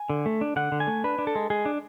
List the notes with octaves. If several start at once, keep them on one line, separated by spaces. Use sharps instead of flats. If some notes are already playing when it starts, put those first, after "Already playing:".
Already playing: G#5
D3
A3
D4
D3 F#5
D3
G#5
A3
D4 B4
D4
A4
G#3
G#3 G#4
D4